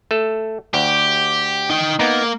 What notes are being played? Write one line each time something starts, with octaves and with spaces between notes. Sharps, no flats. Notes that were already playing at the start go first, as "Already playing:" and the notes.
A3 A4
D2 G4
D#4 G5
A#3 B3 D#4